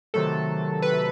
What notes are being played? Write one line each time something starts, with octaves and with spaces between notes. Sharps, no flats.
C3 D#3 F#3 A3 A4
B4